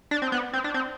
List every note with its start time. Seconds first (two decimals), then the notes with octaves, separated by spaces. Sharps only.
0.11 D4
0.22 C4
0.32 B3
0.53 C4
0.64 D4
0.74 C4